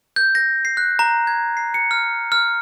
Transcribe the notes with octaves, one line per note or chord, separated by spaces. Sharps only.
G6
A#6
C7
F#6
A#5
G#6
C7
C#7
F6
F6